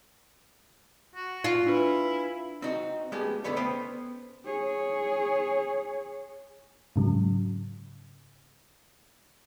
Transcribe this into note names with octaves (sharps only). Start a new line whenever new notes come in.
F#4
F4
D4 E4 B4
C4 D#4 F#4
G#3 A3 B3 C#4 G4
B1 F2 D3 A3 B3 C#5
B3 C#4 B4 C5 G5
G#4 C#5
G#2 C#3 F#3